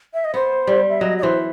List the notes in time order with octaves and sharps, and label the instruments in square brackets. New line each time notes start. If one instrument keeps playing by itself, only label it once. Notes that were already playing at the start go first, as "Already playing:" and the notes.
[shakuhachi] E5
D#5
[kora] B3 [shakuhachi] C5
[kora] G3
[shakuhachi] E5
[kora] F#3 [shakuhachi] D#5
[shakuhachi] D#5
[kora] E3 [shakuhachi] C5